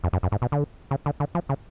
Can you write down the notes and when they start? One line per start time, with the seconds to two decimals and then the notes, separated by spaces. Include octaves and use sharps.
0.04 F2
0.13 F#2
0.23 F#2
0.32 G#2
0.42 B2
0.52 D3
0.91 C#3
1.06 D3
1.20 D3
1.35 F3
1.49 C#3